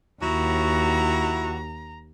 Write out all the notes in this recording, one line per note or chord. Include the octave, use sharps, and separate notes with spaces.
D#2 E4 F#4 A#5